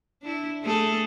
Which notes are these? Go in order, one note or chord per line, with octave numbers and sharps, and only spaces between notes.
D4 E4
A3 G#4 A4